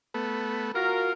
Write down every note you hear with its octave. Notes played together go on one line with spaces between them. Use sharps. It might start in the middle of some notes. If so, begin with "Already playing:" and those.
A3 B3
F4 F#4 A#4